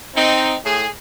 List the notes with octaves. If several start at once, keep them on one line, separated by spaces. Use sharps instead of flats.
C4 D#4
A2 G#4